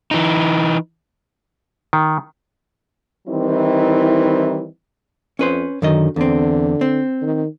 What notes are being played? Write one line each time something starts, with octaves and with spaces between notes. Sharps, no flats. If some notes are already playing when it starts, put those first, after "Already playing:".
E3 D#4
D#3
D#3 E3 G3 C4 D#4 E4
F2 C#4 B4 C5
F#2 D3 D#3 D#5
E2 D3 C4
C4
D#3